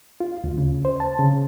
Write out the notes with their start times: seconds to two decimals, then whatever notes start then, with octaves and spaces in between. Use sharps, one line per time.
0.20 F4
0.44 D2
0.58 C#3
0.85 C5
1.00 A5
1.19 C#3